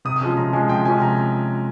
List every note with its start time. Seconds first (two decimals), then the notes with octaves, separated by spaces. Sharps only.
0.05 C3 D#6
0.16 D#6
0.21 F3 G#3 C#4
0.37 C3 A#5
0.53 F3 G#3 C#4 G#5
0.69 C3 G5
0.85 F3 G#3 C#4 G#5
1.02 C3 A#5